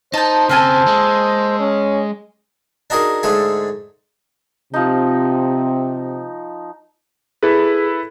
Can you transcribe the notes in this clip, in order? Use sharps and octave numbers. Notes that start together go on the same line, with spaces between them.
D#4 C5 A5 G6
C#3 A#3 C4 A4 G#5
G#3
C#4
D4 D#4 F#4 G#4 A#4
G#2 D3 A3 G#4
C3 F3 D#4
E4 G#4 A4 B4